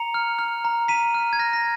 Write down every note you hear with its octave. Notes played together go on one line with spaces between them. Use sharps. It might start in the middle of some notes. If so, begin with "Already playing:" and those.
Already playing: A#5 C#7 F7
F6
F6
A#5
A#5 B6 D#7
F6
G#6
F6 A#6
A#6